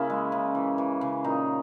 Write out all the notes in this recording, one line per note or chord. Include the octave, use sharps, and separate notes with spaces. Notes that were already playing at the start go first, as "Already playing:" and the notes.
Already playing: C#3 A#3 C#4 E4
G#3
C#3
E3
E3
C#3
A#2 D#4